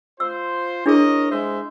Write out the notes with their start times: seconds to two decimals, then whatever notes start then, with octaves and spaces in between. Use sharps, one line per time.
0.20 F4 C5 E6
0.86 D4 E4 G#4 A#4 C#5 D#5
1.32 G#3 C5 E5